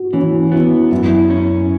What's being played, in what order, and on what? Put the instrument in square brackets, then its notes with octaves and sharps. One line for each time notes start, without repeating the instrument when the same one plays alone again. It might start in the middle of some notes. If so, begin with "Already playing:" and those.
Already playing: [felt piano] F#4
[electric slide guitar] E3 [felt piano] C#4
[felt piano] F#4
[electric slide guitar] B3 [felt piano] E4
[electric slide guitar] F#2 [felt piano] E4
[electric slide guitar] C#4